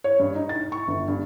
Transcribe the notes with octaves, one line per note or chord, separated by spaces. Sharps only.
C#5
G2
D#4
A6
C#6
G1
G2